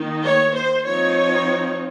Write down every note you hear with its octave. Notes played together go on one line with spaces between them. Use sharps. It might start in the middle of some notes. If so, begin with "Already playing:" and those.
Already playing: D#3 A#3 D#4
C#5
C5
F3 C4 D#4 C#5